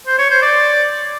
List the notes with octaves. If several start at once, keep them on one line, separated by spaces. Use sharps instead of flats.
C5
C#5
C5
D5